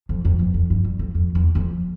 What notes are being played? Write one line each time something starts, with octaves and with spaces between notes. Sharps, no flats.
F2
F2
E2
F2
G2
G2
F2
F2
E2
F2